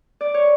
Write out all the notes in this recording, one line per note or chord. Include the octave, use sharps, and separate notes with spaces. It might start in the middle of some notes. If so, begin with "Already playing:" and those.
D5
C#5